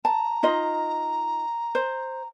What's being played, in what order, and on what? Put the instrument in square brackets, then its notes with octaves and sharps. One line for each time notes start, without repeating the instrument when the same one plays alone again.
[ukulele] A5 [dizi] A#5
[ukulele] D#4 F4 D#5
C5